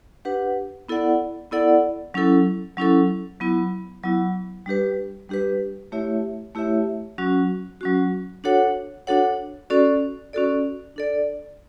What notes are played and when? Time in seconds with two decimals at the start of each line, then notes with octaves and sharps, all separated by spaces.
0.25 D4 G4 B4 F#5
0.89 B3 E4 A4 D5 F#5
1.51 B3 E4 A4 D5 F#5
2.14 F#3 C#4 E4 A4
2.77 F#3 C#4 E4 A4
3.40 F#3 B3 E4
4.03 F#3 B3 E4
4.66 G3 D4 G4 B4
5.29 G3 D4 G4 B4
5.92 A3 E4 G4 C#5 E5
6.55 A3 E4 G4 C#5 E5
7.18 F#3 C#4 F#4
7.81 F#3 C#4 F#4
8.44 D4 F#4 A4 C#5 F#5
9.07 D4 F#4 A4 C#5 F#5
9.70 C#4 F#4 A4 D5
10.33 C#4 F#4 A4 D5
10.96 D4 A4 D5